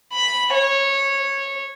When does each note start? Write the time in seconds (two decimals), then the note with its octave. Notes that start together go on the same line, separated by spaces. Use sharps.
0.13 B5
0.54 C#5